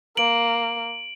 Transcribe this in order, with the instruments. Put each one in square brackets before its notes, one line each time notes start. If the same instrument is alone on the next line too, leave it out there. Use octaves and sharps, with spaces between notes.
[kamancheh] A#3 [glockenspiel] D7 F#7